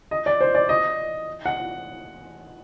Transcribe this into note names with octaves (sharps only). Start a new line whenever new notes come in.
D#5
D5
C5
D5
D#5
F#5